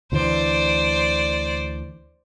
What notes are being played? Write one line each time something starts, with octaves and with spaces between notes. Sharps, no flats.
D2 D3 E3 C5 D5